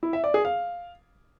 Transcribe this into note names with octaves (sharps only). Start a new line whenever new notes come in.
E4
E5
D5
G#4
F5